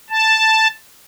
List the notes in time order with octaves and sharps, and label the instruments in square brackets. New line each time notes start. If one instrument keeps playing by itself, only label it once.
[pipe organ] A5